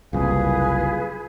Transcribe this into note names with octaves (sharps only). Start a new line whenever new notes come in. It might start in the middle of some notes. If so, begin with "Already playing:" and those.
F#1 C2 F4 G#4 B4